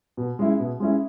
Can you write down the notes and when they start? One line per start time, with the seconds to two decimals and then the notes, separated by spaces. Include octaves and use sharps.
0.17 B2
0.39 G#3 C#4 E4
0.60 B2
0.80 G#3 C#4 E4